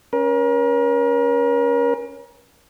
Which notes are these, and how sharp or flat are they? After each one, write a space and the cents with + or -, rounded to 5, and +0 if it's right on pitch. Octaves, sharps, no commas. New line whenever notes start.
C#4 +0 A#4 +35